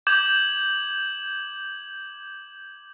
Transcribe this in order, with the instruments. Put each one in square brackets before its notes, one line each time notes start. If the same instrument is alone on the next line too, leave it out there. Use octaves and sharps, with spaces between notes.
[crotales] D6 G6 G#6 E7 F#7